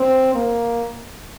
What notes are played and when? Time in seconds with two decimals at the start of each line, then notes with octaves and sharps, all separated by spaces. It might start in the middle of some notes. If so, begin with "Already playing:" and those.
Already playing: C4
0.35 A#3